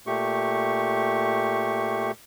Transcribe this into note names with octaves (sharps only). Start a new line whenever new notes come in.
A#2 A3 G4 C#6